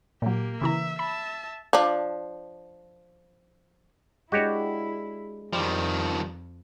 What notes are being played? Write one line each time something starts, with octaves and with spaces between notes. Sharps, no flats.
A#2 F#3 A#3 G4
C#3 E3 E5 A#5
E5 A5 B5
F3 D4
G#3 D4 E4 F#4 G4 C#5
F2 D#3 F3 G3